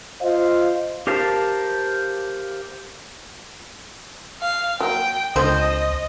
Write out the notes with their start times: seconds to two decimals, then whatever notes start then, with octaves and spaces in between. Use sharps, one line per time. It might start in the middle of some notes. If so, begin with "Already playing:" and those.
0.21 F4 C5 D#5 F5
1.07 G4 A#4 C5 F5 A5
4.41 F5
4.80 F#3 A#3 G5
5.36 C#2 D3 F3 C4 C5 D#5